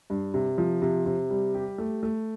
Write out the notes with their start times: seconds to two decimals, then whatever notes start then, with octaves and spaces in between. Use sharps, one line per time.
0.10 G2
0.34 C3
0.58 F3
0.82 C3
1.06 C3
1.30 G3
1.54 G4
1.78 A3
2.03 A3